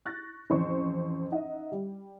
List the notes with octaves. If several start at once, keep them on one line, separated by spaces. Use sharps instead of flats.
C#6 F#6 A6 A#6
A1 F2 C5 C#6
D#4 D#5 E5 F#5
G3